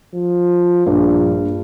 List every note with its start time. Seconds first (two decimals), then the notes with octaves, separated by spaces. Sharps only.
0.14 F3
0.86 A#1 G2